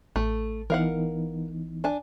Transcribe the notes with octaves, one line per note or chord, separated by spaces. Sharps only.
A1 A3
E3 B3 D#4 A#4 F5 F#5
D4 G#5 A5